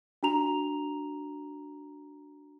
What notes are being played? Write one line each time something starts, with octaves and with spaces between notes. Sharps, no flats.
D4 F#4 A#5 F7